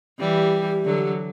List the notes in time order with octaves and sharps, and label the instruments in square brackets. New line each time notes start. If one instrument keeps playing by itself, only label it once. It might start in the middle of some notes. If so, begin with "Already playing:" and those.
[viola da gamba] E3 G3 [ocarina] G4
[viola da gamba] D3 F#3